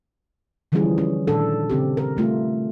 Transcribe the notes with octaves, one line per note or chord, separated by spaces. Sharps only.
D3 E3 F3 G3 C#4 G#4
C#4
A#2 D#3 D4 A4
C#3 C4 G4
A#4
G3 A3 F4